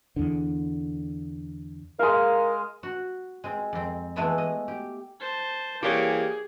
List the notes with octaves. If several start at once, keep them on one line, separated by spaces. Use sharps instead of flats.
E2 D3
G#3 A#4 F5
F#4
G#3 C4
F2 C4
E3 G#3 A3 B3 E4 E5
D#5
G4
C5 A5
E3 G3 A#3 G4 G#4 C#5